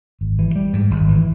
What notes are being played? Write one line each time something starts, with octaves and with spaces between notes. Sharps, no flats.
G#1
E3
G3
G#2
G#1
E3